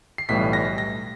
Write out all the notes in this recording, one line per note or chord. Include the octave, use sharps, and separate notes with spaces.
C7
B1 A2 E3 G3 B6
A#6
A#6